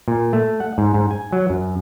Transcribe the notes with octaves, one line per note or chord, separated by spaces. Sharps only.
A#2
A3
F#5
G#2
G#2
G#5
F#3
F#2